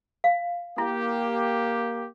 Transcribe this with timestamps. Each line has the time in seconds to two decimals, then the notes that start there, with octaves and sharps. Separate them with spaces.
0.24 F5
0.78 A#3 E4 G4